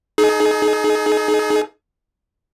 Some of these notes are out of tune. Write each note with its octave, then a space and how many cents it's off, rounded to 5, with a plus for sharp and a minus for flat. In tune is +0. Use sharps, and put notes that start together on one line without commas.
D#4 -5 G#4 +35